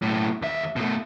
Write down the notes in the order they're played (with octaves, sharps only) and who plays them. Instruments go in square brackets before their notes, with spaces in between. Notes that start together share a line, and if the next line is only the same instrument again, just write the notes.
[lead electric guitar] B1 A2
D#2 E5
B2 A3